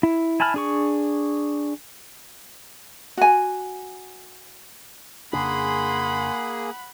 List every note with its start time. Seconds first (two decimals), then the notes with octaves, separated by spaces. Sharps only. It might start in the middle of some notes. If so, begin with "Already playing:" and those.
0.03 E4
0.40 E4 G#5 A5 B5 F6
0.54 D4 G#4 C#6
3.17 F#4 G#5
5.33 F2 C#3 A#3 D4 G#4 F#5 B5 C6